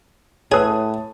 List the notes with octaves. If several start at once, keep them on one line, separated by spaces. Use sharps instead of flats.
A2 G#4 B4 C#5 A5 D#6